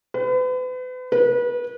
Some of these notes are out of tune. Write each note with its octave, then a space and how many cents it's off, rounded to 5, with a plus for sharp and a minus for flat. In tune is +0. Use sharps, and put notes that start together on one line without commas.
B4 +40
B4 -30